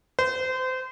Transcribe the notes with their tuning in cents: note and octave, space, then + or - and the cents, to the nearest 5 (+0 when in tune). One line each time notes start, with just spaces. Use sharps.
C5 -30